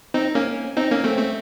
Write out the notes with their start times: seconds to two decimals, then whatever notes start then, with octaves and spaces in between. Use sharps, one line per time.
0.14 C4 D#4
0.35 A#3 C#4
0.77 C4 D#4
0.91 A#3 C#4
1.04 A3 C4
1.18 A3 C4